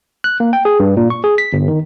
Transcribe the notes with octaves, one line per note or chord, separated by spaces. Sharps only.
F#6
A#3
G5
G#4
G2
A#2
C#6
G#4
B6
G1
D#3